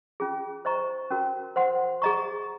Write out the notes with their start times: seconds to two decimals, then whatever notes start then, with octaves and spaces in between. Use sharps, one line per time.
0.20 C#4 F4 G#4
0.65 C5 D#5 A#5 C#6
1.11 C#4 F#4 A#4
1.56 C5 F#5 C6
2.02 G#4 D#5 A#5 C#6